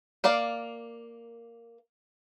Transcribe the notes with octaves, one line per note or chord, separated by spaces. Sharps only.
A#3 A#4 D5 F5